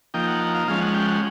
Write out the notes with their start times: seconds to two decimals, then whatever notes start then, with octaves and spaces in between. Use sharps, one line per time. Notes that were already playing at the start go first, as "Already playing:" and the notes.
0.14 F3 A#3 D#4 G5
0.28 F#5
0.54 F5
0.68 F3 G#3 C#4 F5
0.81 F#5
0.94 G5
1.08 F#5